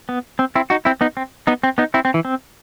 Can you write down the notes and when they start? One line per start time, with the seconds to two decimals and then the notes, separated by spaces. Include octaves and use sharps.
0.09 B3
0.39 C4
0.55 C4 E4
0.70 D#4 F#4
0.85 C4 E4
1.01 B3 D#4
1.17 C4
1.47 B3 D#4
1.63 C4
1.78 B3 D#4
1.94 C4 E4
2.05 C4
2.14 E3
2.25 C4